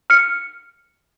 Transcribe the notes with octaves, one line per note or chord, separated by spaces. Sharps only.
F6 C#7